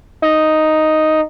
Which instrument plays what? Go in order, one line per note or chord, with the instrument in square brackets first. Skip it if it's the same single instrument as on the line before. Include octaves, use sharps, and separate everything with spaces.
[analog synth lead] D#4